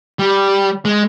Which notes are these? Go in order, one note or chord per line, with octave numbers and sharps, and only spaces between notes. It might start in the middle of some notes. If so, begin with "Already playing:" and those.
G3
G#3